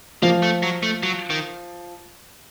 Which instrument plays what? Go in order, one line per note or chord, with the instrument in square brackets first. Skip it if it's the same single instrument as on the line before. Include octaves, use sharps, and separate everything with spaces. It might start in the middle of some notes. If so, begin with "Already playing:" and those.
[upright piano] F3 F4 [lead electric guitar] A#3
[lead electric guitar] A3
F#3
A3
F#3
D#3